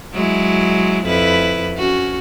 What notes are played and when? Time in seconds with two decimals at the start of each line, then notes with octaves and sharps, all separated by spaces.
0.13 F#3 G#3 E4
1.06 F2 E4 B4
1.76 C#4 F#4